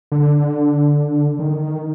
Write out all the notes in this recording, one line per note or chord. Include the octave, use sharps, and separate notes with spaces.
D3
D#3